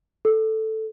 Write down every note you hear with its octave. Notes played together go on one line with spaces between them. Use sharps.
A4